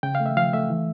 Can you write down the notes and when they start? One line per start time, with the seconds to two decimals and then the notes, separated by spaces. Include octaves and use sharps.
0.03 C#3 G5
0.15 F5
0.20 A3
0.26 E5
0.37 F3 F5
0.53 A3 E5
0.70 E3